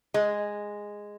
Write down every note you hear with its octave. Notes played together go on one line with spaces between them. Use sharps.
G#3